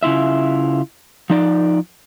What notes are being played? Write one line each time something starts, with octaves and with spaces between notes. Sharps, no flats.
C#3 E4 F4 E5
F3 D#4 D5